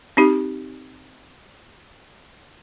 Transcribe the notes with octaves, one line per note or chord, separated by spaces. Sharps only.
C4 D#4 G4